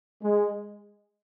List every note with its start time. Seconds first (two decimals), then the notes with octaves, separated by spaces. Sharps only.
0.22 G#3